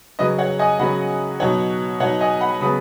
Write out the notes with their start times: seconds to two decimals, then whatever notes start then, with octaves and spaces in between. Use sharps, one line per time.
0.19 C#3 F#3 C#4 B4 D#5
0.38 C#5 F#5
0.59 D#5 G#5
0.79 C#3 F#3 C#4 F#5 B5
1.40 B2 F#3 D#4 C#5 F#5
2.00 B2 F#3 D#4 C#5 F#5
2.21 D#5 G#5
2.41 F#5 B5
2.61 C#3 F#3 B3 B5 D#6